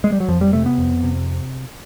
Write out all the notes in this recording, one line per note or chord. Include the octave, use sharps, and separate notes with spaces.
G#3
G3
F#3
F2 F3
G3
C3 A3
B3
F2
C3